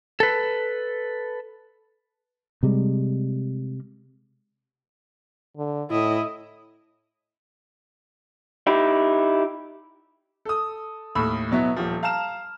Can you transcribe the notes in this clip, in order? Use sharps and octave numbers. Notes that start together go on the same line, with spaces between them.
A4 B4
C3 G3 G#3
D3
A2 E4 D#5
D#4 E4 G4
A4 D#6
D#2 A2 B5 E6
B2 F#3 B3 E4
D#1 F3
F5 A5 A#5 F6 E7